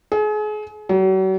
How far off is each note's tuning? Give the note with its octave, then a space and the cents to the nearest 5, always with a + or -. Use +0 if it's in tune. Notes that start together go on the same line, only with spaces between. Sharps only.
G#4 +35
F#3 +40